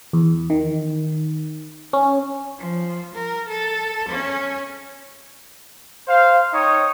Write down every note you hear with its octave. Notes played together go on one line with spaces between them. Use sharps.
E2
D#3
C#4
F3
A#4
A4
C#4
C5 F5
D#4 C#5 G5 C#6 D#6